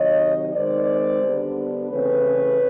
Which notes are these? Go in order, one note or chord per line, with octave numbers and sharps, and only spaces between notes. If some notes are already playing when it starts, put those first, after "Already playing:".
Already playing: C3 D#3 F#3 C#5 D#5
D#3 G#3 C4 C5 D5
D3 G3 B3 D4
C#3 E3 A3 C4 B4 C#5